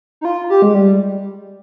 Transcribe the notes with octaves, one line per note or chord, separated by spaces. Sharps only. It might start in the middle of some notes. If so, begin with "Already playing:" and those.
D#4
F4
G4
G#3
G3